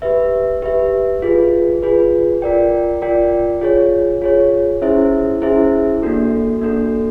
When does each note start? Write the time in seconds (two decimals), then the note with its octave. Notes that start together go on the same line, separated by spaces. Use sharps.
0.02 G4 B4 E5
0.62 G4 B4 E5
1.22 F4 G#4 B4
1.83 F4 G#4 B4
2.42 F4 A#4 D5 G5
3.02 F4 A#4 D5 G5
3.61 F4 G#4 C#5
4.22 F4 G#4 C#5
4.82 C#4 E4 G#4 C5 E5
5.42 C#4 E4 G#4 C5 E5
6.02 A#3 D4 F#4 A4
6.61 A#3 D4 F#4 A4